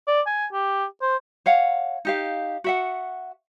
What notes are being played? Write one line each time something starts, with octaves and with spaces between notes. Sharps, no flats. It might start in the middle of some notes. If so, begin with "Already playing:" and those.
D5
G#5
G4
C5
C#5 F5 F#5
D#4 G4 F5
F#4 E5 F#5